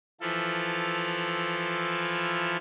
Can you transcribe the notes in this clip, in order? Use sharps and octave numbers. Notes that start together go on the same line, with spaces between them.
E3 F3 E4 F4 A4